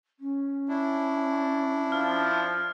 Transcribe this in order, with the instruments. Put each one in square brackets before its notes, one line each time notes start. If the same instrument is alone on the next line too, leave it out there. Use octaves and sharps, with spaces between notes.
[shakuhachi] C#4
[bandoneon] D4 E4
[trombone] F3 [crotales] F6